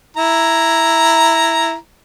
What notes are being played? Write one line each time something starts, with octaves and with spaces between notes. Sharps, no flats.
E4 A#5